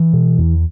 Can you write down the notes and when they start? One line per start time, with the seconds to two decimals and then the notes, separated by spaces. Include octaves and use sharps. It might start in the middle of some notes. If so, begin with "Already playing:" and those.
Already playing: E3
0.13 B2
0.38 E2